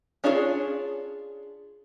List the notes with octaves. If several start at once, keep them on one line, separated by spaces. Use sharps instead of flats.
C#4 D4 F4 G#4 C#5